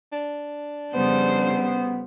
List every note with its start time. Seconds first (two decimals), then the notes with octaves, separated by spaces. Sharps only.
0.13 D4
0.93 F2 C#3 G3 B3 C5